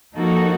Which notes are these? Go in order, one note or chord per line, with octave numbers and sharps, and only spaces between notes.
F3 A#3 D#4 F#4 A4